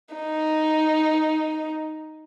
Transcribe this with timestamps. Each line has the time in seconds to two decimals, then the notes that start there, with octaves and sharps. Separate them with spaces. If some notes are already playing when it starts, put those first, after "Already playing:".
0.15 D#4